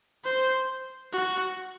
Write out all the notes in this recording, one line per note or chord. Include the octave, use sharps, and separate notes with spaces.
C5
F#4